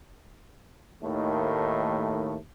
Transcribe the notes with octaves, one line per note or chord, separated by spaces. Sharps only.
D#2 A2 D#3 A3